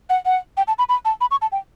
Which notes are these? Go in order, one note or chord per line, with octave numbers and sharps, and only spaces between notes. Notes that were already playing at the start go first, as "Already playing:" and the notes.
F#5
F#5
G5
A5
B5
B5
A5
B5
C#6
A5
G5